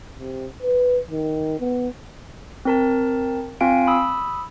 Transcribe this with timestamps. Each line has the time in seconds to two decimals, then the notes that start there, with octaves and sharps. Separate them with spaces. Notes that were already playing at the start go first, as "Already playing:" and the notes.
0.19 C3
0.62 B4
1.10 D#3
1.60 B3
2.65 C4 A#4 A5
3.61 C4 F4 F5 G#5 D7
3.87 B5 D#6 E6